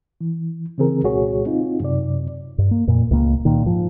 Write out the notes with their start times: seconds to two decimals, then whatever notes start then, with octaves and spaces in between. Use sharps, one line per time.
0.21 E3
0.78 C#3 E3 C4 G#4 A#4
1.03 C2 A#2 G#3 F#4 G#4 C#5
1.46 C4 D#4 F4
1.80 F#2 C3 D5
2.58 G2
2.71 A#3
2.87 F2 A#2
3.11 C#2 A#3
3.45 A#2 D#3
3.66 G#2 F3